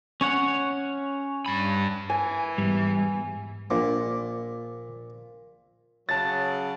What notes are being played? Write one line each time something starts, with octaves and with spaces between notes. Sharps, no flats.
C#4 C#5 F#5
G2 B5
E3 G#5
E2 G#2 G3
A#1 A#2 C5 D6
C#3 F#3 A5 A6